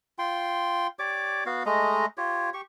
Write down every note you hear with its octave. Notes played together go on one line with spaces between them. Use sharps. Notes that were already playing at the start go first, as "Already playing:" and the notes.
F4 G5 C6
G4 C#5 D5 D6
B3 F#4 F5
G#3 A3 D#5 A#5
F4 G4 C#5
G4 C#6